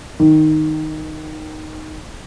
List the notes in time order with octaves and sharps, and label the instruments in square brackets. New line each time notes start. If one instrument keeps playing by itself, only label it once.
[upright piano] D#3